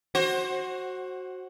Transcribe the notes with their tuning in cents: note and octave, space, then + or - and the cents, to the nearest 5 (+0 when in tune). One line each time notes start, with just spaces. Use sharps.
F#4 +0 C5 +25